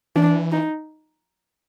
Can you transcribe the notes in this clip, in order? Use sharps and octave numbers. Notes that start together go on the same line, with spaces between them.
E3 D4
D#4